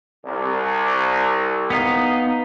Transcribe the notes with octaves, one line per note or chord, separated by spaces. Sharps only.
C2
B3 D#4 F5